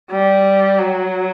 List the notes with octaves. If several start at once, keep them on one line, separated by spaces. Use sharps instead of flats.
G3
F#3